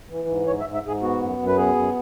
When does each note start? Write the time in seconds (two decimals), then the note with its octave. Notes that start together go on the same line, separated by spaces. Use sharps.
0.10 E3
0.28 G#2
0.47 G#2 C#5
0.60 E5
0.66 G#2
0.74 E5
0.83 G#2 G#4
1.02 B3 F#4
1.20 F#2
1.38 F#2
1.47 B4
1.57 B3 G#4
1.75 F#2